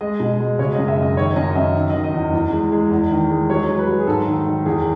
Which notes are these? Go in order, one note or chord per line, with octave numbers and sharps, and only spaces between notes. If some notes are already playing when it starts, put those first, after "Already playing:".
G#3 D#5
B2
G#3
C#3 C#5
D#5
F#2
E5
F#2 D#5
D#3 C#5
F#2 D#5
F#2 E5
D#3
D#5
D#3
D#5
E2
E2
G#3
G#3
E2
D#3
G#3
F#3 C#5
F#3
B4
F#3
G#4
G#2 A4
D#3
D#3
E2 G#4